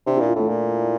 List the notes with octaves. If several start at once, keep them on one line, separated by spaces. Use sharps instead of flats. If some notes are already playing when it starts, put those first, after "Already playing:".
C3 D4
A#2 E4
F4
A2 A3
A#2